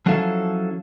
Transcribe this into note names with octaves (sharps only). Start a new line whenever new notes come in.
F3 F#3 C#4 E4 A4 F5